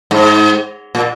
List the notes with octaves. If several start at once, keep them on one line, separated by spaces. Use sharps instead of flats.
G#2
A#2